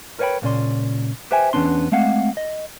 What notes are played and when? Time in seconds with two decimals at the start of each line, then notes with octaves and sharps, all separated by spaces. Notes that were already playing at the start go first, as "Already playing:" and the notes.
0.19 A#4 B4 C#5 E5 G5 B5
0.42 C#2 A#2 C#4 D5 C6
1.31 G4 B4 C5 E5 G5 G#5
1.53 E2 C3 B3 C#4 D4 C6
1.92 G#3 A3 C4 F5 F#5
2.37 D#5